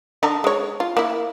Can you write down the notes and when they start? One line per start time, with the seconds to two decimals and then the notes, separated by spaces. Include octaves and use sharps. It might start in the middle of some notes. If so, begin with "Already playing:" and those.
0.23 D3 D4 D#4
0.44 G#3 C#5
0.80 F4
0.97 A#3 E4